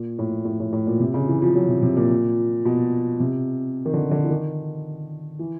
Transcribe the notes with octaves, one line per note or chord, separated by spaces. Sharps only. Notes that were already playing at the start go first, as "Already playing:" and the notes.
Already playing: A#2
A2
A2
A2
A2
A#2
C3
C#3
E3
F3
F#3
C3
C3
A#2
B2
C3
D#3
D3
D3
E3
D#3
E3